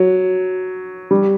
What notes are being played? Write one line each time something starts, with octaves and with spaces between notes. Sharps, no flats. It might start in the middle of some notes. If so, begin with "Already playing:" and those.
Already playing: F#3
G3